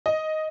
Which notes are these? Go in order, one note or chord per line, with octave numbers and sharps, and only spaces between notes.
D#5